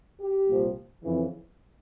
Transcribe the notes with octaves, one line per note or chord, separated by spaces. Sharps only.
G4
C2 A#2 F3
F2 C#3 E3